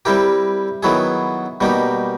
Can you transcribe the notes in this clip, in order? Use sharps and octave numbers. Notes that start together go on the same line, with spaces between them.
G3 C4 E4 G4 A#4
D#3 F#3 B3 E4 G#4
B2 G3 A#3 D#4 G4